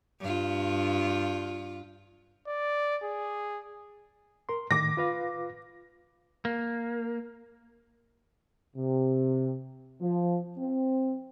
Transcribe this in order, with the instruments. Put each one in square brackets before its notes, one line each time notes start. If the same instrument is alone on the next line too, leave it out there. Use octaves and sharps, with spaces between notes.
[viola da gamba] G2 F4
[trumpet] D5
G#4
[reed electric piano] A#4 C6
[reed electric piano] A2 D#3 [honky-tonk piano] D6 A#6
[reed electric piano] F4 B4 F5
[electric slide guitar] A#3
[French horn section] C3
F3
C4